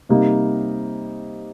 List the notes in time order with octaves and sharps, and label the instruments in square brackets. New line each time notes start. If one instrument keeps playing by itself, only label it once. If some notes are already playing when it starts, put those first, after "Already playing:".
[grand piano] C3 G3 A#3 D#4